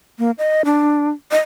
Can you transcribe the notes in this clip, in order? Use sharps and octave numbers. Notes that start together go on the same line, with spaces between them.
A#3
D#5
D4
D#5